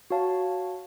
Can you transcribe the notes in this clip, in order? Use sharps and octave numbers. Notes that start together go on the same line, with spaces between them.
F#4 C#5 F5 A5